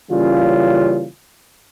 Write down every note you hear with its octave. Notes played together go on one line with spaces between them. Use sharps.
C#3 E3 G3 A#3 C#4 F4